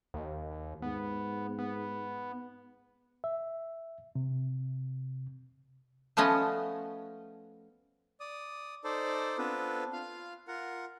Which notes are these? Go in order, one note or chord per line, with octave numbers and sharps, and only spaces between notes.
D#2
G#2 B3
B3
E5
C3
F3 A3 B3 C#4 D#5
D5 D#6
D#4 A4 C5 D5
B3 C4 D4 F4 A4 B4
F4 F5
F4 A#4 F#5